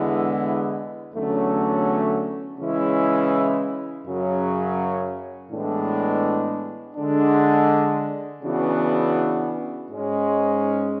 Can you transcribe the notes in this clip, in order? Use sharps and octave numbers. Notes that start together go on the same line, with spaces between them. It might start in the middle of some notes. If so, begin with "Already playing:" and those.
Already playing: E2 D3 G#3 B3 E4
E2 D3 F#3 A3 C#4
C#3 E3 G#3 C#4 E4
F#2 C#3 F#3
A2 E3 G#3 B3 D4
D3 G#3 D4
C#3 E3 B3 D4 F#4
G#2 G#3 C#4